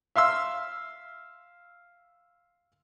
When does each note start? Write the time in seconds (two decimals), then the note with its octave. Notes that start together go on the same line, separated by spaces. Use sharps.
0.16 E5 F5 C6 E6